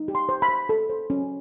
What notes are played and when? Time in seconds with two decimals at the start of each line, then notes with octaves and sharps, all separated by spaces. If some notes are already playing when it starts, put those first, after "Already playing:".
Already playing: D#4
0.08 G4
0.15 C6
0.29 C5
0.42 B5
0.49 C5
0.69 A4
0.90 C5
1.10 C#4